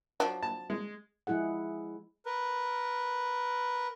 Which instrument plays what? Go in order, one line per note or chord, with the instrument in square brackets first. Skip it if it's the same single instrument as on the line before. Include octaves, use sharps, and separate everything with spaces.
[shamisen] F3 F#3 D4
[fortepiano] A5
G#3
[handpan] F3 G#3 E4 G#4 F#5
[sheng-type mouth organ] A#4 B4